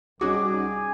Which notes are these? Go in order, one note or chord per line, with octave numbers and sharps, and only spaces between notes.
C2 G3 C#4 D#4 F#4 G#4 D6